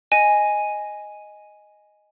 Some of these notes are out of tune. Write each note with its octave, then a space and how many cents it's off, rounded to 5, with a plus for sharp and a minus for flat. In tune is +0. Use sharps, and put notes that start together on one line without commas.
D#5 +0 G#5 +0